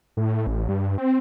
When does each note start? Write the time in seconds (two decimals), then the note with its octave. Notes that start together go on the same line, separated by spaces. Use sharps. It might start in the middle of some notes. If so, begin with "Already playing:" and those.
0.17 A2
0.47 A1
0.69 G2
0.98 C4